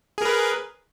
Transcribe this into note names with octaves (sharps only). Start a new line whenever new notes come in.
G#4 A#4 B4